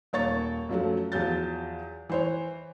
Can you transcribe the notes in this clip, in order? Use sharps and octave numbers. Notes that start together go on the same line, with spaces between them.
D#1 A#3 C#5 C#6 A6
F#2 F3 F#3 A3
E2 F3 F#3 G6 A6
E3 C5 C#5